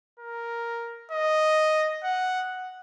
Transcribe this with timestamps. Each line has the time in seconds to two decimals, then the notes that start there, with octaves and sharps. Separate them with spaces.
0.20 A#4
1.12 D#5
2.04 F#5